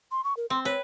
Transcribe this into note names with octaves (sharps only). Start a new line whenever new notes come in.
C6
C#6
A#4
C4 C6
B4 C#5